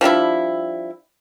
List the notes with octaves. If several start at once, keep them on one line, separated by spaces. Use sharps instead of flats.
F3 G3 D4 E4